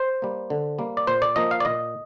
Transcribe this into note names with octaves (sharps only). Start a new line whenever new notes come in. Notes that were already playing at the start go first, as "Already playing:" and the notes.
Already playing: C5
G3 A#3
D3
G3 A#3
D5
A#2 C5
D5
F3 A#3 D#5
F5
D5
A#2 D#5